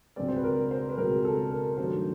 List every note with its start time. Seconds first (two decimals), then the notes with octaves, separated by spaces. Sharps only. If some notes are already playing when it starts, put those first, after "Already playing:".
0.16 C#2 B2 G#3 C4 D5
0.28 C5
0.36 B4
0.44 A#4
0.71 C5
0.89 B4
0.97 C#2 B2 G#3 C4 A#4
1.25 A4
1.52 A#4
1.78 G2 D#3 F#3 A3 D4 C5